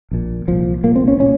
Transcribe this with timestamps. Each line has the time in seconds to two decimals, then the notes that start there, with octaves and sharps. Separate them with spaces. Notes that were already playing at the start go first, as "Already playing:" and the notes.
0.11 A#1 A#2
0.47 C2 A#2 F3
0.84 C2 A#2 A#3
0.96 C4
1.08 C#4
1.20 A#2 C#4